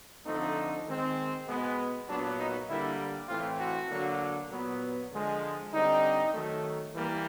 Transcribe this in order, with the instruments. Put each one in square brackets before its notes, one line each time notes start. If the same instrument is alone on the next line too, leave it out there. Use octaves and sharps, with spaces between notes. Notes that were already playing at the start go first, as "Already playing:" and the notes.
[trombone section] D3 F3 A3 C4 D#4
D#3 G#3 C4
B2 G#3 B3
A#2 F#3 B3 D4
D#4
D3 G3 A#3 E4
A2 E3 A3 C4 F4
F#4
D3 F#3 A#3
A#2 F#3 B3
D3 F3 G#3
D3 G3 C4 D#4
D#3 F#3 A3
E3 G3 A#3